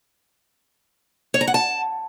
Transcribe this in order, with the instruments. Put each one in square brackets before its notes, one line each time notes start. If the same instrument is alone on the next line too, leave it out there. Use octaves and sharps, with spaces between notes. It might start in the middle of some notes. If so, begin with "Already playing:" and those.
[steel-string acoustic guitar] C#5
A#5
F#5
A5